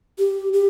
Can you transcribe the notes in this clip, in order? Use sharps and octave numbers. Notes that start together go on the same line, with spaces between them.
G4
G4